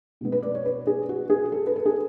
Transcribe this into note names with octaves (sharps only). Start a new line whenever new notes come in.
B2 G#3 B3
B4
D5
C#5
B4
G#4
F#4
G#4
A4
B4
A4
G#4